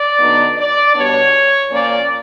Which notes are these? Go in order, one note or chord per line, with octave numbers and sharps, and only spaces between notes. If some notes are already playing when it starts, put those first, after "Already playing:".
Already playing: D5
D3 F#3 B3 D#4
D5
B2 G3 B3 D4 C#5
A#2 F3 A#3 C#4 D5